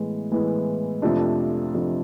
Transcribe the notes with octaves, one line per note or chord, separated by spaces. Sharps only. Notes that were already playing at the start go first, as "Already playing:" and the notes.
Already playing: A2 E3 G#3 B3
A2 E3 G#3 B3
F2 C3 F3 A3 D4
F2 C3 F3 A3 D4